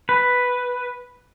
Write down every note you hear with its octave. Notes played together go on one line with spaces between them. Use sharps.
B4